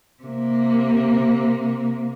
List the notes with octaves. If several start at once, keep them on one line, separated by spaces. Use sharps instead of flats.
C3 A#3